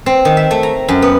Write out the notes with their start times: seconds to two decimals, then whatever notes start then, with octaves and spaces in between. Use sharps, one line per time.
0.06 C4
0.25 D#3
0.37 E5
0.51 A3
0.63 A#5
0.88 F#2
1.02 B3